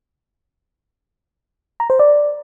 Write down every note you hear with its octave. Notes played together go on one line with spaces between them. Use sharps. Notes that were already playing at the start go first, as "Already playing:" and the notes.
A#5
C5
D5